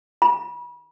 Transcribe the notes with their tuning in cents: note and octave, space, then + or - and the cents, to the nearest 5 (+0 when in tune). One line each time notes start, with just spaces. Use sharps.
B5 -35